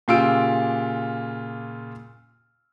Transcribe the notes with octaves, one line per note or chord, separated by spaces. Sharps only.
A#2 C#3 F4 G4 E6 D7